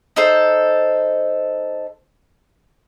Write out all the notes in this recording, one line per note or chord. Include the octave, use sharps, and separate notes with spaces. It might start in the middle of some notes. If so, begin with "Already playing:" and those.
D#4 A4 C5